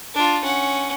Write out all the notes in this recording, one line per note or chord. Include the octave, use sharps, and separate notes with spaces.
D4 F4
C#4 F#5